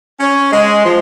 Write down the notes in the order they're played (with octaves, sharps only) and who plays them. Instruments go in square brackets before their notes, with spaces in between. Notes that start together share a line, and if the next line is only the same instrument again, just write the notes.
[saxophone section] C#4
G#3
F3